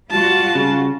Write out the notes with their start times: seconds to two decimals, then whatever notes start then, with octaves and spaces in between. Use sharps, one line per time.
0.11 G3 F4 F#4 A5
0.55 C#3